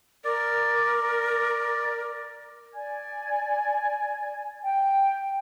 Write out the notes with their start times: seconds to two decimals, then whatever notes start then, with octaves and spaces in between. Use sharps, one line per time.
0.24 A#4 D5
2.74 D5 G#5 G#6
4.63 G5